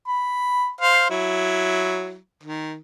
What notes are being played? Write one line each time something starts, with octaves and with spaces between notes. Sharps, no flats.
B5
C5 F5
F#3 E4
D#3